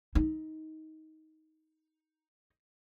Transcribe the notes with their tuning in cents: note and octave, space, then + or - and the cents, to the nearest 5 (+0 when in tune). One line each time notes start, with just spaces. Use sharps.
D#4 +15